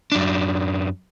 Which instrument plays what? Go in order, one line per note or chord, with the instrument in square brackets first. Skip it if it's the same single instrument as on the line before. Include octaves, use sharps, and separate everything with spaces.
[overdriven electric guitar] F#2 D4